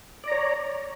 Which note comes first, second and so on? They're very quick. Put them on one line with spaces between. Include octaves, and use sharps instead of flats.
D5 A#5 C#5